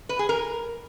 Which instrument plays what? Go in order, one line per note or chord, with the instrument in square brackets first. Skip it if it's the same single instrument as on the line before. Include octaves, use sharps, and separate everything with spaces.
[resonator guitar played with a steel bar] B4
G#4
A#4